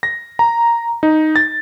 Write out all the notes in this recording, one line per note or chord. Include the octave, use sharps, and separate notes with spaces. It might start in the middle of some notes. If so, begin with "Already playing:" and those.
A#6
A#5
D#4
A6